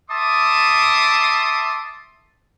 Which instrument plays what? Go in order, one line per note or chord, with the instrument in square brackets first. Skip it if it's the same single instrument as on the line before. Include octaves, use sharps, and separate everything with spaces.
[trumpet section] E5 A5 C6 D6 D#6